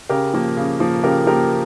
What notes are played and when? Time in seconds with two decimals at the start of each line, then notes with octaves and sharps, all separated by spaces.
0.09 C#3 G4 A#4
0.34 F3 A#3
0.57 C#3
0.80 F3 A#3
1.03 C#3 G4 A#4
1.26 F3 A#3 G4 A#4